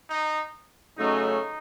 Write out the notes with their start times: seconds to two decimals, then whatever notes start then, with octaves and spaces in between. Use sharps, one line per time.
0.09 D#4
0.97 C#3 F#3 A3 C#4 D#4
1.26 D#4